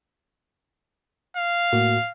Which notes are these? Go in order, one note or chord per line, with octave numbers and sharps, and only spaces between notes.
F5
A2 A#3 F#4